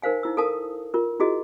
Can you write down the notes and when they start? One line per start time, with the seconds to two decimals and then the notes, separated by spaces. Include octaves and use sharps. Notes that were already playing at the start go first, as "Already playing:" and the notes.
0.02 D#4 A#4 C5 F5 G#5
0.23 D#4 E4 E6
0.37 A4 A#4 F5 A5 D#6
0.94 F4 A#4
1.20 E4 F#4 G#4 D#5